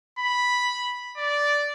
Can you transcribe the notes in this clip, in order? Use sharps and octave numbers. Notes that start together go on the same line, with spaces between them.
B5
D5